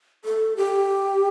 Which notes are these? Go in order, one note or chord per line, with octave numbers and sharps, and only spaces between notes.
A4
G4